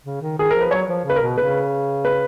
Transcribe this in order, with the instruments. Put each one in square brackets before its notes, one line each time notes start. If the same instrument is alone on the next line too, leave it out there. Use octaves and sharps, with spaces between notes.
[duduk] C#3
D#3
[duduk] D#3 [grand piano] G#4
[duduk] F3 [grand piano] A#4
[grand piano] B4
[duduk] F#3 [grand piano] C#5
[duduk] F3
[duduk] C#3 [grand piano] B4
[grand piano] A#4
[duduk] B2
[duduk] C#3 [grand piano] B4
[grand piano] B4